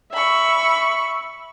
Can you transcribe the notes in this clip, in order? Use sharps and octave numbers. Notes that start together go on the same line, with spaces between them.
E5 B5 C#6